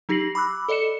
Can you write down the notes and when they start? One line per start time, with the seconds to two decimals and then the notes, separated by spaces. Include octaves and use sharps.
0.09 F#3 D#4 G4 A#6 C7 F#7
0.35 B5 D6 E6 F#6
0.69 A4 D5 D#5 C#7 E7